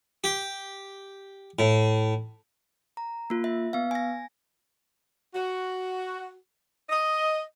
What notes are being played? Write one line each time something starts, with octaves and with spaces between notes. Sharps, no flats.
G4
A2
A#5
A#3 F4
E5
B3 F5
G#5 A#6
F#4
D#5